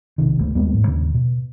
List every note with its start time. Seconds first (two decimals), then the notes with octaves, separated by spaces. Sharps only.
0.18 B1 C3 D#3
0.39 G1 C#2 A3
0.55 D#2 G3 G#3 B3
0.73 A1 G#2 A3
0.87 D#2 C#3
1.14 B2